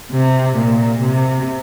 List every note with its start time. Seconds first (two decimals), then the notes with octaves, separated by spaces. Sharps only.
0.11 C3
0.56 A#2
1.01 C3